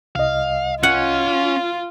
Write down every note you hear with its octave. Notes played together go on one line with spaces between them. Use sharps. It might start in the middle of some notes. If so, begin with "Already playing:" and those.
C2 D#5 F5
C#4 F4 F#5